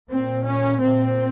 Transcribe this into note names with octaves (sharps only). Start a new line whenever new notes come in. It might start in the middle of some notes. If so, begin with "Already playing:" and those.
A#2 C4
C#4
A#2 C4